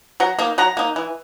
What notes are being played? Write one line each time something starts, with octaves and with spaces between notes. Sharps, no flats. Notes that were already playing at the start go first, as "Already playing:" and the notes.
F#3 F#5 A#5
A#3 D#4
F#3 F#5 A#5
A#3 D#4
E3